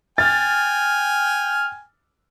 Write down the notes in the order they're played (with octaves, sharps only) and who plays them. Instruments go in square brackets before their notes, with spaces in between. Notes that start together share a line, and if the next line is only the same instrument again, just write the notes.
[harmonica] G5 G#5 [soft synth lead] F6 [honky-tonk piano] A6